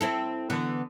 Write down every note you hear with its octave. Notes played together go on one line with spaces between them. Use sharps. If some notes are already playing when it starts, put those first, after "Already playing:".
C4 E4 A4
D3 E3 B3